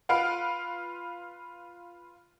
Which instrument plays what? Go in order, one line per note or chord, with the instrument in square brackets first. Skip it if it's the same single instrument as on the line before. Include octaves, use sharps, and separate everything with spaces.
[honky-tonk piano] F4 B4 F5 D7